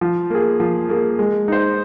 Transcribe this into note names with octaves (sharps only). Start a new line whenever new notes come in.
F3
A#3 G#4
F3
A#3 G#4
G#3
D#4 C5